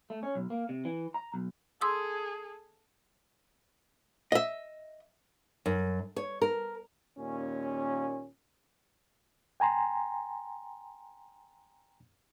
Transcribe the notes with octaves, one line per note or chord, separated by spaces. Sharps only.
A3
C#4
B1
A#3
C3
E3
A#5
B1
G#4 A4 C6 D#6 E6
D#5 E5
F#2
C#5
A#4
D#2 A#2 C#4
G5 G#5 A#5 C6